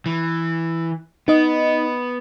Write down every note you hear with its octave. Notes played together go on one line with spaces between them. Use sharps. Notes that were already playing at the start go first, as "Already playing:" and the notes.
E3
B3 D#4 D#5